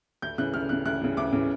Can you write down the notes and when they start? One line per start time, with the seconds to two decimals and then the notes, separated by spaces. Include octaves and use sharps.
0.22 D2 G6
0.38 C#3 E3 F#6
0.54 D2 F6
0.69 C#3 E3 F#6
0.86 D2 F#6
1.01 C#3 E3
1.17 D2 D6
1.33 C#3 E3